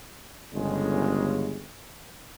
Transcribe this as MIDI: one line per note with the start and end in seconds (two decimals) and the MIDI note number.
0.55 1.63 31
0.55 1.63 49
0.55 1.63 56